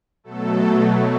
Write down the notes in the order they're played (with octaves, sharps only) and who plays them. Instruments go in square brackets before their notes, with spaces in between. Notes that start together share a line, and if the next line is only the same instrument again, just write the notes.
[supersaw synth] B2 F#3 A3 A4